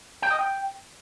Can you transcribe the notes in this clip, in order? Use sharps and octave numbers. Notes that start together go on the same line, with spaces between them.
G5
D#5
G5